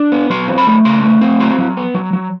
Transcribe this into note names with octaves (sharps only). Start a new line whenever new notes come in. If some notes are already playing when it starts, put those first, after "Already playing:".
Already playing: D4
B3
F#3 C6
C4
B5
A3
C#3 C6
A3
C4
F#3 C6
F#3
B3
F#3
F#3